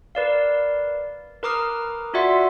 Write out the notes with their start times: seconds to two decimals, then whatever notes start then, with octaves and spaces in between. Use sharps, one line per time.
0.15 A#4 B4 D5 F5
1.43 A#4 B4 A#5 D6 D#6 F6
2.14 F4 F#4 D5 E5 F#5 C6